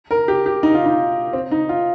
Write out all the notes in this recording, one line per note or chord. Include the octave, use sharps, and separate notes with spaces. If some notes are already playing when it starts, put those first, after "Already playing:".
A#4
G4
G4
D#4
F4
D#4
C4
D#4
F4